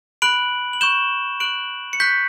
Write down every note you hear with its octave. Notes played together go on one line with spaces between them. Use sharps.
B5 F#6 D7 F#7
F#7
C#6 G6 E7 G7
C#6 F#6 D7 F#7
C#7
C#6 F#6 G6 B6